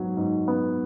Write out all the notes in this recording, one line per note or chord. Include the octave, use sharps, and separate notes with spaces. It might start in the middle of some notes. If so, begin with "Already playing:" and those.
Already playing: G#2 F#3 B3
G#2
B3